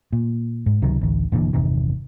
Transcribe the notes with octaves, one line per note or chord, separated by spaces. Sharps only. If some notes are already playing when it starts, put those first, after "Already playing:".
A#2
G#2
C#2 C3 D#3 F#3
A1 D2
F1 A#2 D3 E3
G1 E2 C3 D#3